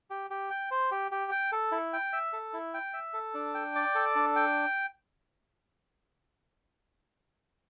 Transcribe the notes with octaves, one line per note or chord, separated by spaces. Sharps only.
G4
G4
G5
C5
G4
G4
G5
A4
E4
G5
E5
A4
E4
G5
E5
A4
D4
G5
D5
A4
D4
G5